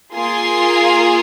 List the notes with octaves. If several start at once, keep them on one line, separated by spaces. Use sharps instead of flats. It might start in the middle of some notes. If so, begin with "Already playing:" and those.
A#3 F4 G#4 G#5 C6